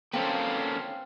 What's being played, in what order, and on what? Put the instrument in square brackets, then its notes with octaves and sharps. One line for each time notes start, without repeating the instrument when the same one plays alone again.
[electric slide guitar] A#3 A4 C5 [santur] C4 [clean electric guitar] C#4 B4 [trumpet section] F5